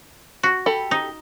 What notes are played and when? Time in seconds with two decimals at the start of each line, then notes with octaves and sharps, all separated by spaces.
0.43 F#4
0.66 G4 A4 B5
0.91 D#4